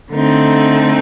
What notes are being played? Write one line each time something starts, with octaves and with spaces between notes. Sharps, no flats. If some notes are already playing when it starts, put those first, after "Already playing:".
D3 A3 C4 D#4